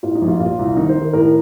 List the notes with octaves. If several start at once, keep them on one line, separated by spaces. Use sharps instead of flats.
A2 F4
D#4
A#1
F4
A#2 F4
C2
D#3 D#4
C5
D#3
A#4
A2 A#4